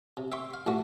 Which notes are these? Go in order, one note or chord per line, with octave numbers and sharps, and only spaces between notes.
C3
E5 G5 C6 C#6
F5
A1 A3 F#4 C#6